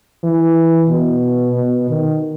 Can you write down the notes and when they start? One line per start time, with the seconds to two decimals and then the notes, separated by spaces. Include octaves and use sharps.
0.24 E3
0.90 B2
1.56 B2
1.90 D#3